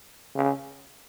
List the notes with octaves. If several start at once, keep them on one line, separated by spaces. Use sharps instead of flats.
C#3